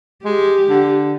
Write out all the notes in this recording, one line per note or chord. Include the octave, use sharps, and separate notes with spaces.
G#3 G4
D3